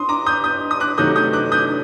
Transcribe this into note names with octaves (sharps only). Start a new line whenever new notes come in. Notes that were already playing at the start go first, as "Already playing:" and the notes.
Already playing: C6 D#6
A#5 D6
D#6 G6
D#6 G6
D#6
D6 F#6
C3 D#3 F#3 A3 D#6 G6
D#6 G6
D6 F#6
D#6 G6